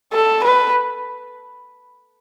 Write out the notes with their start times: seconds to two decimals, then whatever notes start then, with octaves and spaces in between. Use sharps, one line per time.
0.13 A4
0.43 B4